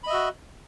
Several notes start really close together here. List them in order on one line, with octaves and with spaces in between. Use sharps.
B5 D#5 E5 F#4